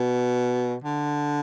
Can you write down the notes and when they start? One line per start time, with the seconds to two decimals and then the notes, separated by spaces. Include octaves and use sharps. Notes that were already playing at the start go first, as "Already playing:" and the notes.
Already playing: B2
0.84 D3